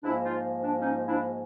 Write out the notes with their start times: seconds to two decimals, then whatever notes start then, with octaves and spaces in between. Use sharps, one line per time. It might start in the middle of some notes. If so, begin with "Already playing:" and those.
0.04 G#2 F3 A#3 D4 E4
0.23 D#4 F4
0.62 D4
0.80 C#4 D#4
1.07 D4 E4